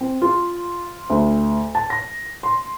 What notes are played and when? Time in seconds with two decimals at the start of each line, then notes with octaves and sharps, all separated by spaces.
0.01 C4
0.22 F4
1.10 D2
1.75 A5
1.90 A#6
2.43 C6